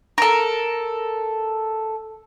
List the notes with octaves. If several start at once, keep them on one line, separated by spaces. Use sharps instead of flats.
A4 A#4